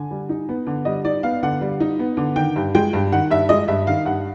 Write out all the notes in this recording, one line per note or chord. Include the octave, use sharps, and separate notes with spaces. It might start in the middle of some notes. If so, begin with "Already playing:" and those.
Already playing: D3 G#5
G3
D#4
B3
D3
G3 D#5
D#4 D5
B3 F5
D3 F#5
G3
D#4
B3
D3
D#3 G5
G2
G#3 G5
G2
D#3 F#5
G2 E5
G#3 D#5
G2 E5
D#3 F5
G2 F#5